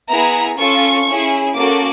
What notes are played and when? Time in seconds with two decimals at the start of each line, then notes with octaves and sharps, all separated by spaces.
0.09 B3 E4 G#4 A#5
0.57 C#4 F4 A4 C#6
1.06 C#4 E4 G#4
1.55 A#3 C#4 F#4 A4 D6